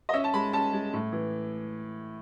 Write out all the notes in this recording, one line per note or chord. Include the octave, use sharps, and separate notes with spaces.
D#5
C#4 E5
A5
G#3 B5
C#4 A5
G#3
A2
E3